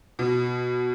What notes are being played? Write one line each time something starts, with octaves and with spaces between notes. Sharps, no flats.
B2